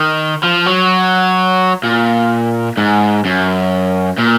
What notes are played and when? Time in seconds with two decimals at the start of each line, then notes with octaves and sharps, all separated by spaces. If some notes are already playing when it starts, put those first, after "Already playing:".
Already playing: D#3
0.43 F3
0.66 F#3
1.83 A#2
2.77 G#2
3.25 F#2
4.19 A#2